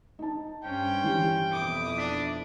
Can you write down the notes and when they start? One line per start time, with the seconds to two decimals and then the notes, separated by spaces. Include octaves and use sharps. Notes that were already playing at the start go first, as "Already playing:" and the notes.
0.19 D#4 A5
0.64 G2 C#4 C5 G5
1.04 E3 G4
1.52 F2 B2 E4 D6 D#6
1.98 D4 B6